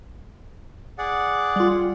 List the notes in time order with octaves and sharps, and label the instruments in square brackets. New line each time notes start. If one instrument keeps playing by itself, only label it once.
[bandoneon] G#4 D5 F#5
[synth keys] G3 F4